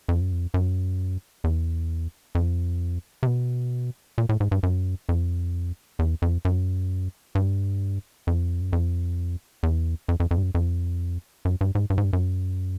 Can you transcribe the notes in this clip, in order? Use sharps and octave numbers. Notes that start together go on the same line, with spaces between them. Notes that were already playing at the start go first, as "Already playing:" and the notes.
F2
F#2
F2
F#2
E2
F2
C3
B2
A#2
A2
G#2
G2
F#2
F2
E2
F2
F#2
G2
F2
F#2
F2
E2
F2
F2
F2
G2
F#2
F2
F#2
G2
G#2
G2
G#2
G2
F#2